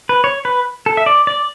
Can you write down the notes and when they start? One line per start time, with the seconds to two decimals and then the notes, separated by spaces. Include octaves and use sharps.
0.09 B4
0.24 C#5
0.45 B4
0.86 A4
0.97 E5
1.06 D5
1.27 D5